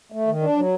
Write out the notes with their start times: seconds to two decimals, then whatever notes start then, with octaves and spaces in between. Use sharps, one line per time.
0.12 A3
0.27 D#3
0.42 D4
0.57 F#3